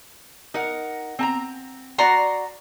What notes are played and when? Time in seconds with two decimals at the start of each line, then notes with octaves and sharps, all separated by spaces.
0.54 D#4 A#4 F#5
1.19 C4 A5 A#5
1.98 F#4 D5 F#5 A#5 C6